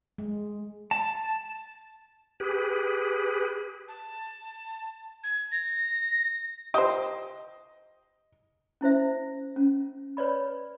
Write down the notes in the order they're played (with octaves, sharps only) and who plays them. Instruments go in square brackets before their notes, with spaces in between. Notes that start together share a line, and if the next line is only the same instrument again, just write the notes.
[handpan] G#3
[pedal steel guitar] A5
[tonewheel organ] G4 G#4 B4
[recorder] A5
G#6
A#6
[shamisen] G4 C5 [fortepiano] D#5
[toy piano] C#4 E4 C5 E5
C#4
B4 C#5 D5 B5